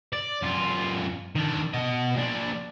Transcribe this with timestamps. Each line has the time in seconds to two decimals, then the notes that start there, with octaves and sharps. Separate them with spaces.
0.13 D5
0.42 F#2 F4
1.35 D#3 D4
1.74 B2 D#5
2.16 A#2 D4